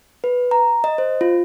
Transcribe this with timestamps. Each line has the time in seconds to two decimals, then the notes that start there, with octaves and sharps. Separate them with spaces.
0.24 B4
0.51 A#5
0.84 D#5
0.98 C5
1.21 F4